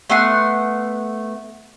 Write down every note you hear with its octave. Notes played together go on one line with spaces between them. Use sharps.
A3 B3 F#5 C6